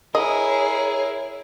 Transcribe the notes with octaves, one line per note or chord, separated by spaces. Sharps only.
E4 G#4 A#4 C#5 D#5